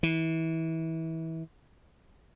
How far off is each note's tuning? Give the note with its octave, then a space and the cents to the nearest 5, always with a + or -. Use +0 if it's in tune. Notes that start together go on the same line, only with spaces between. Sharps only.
E3 -25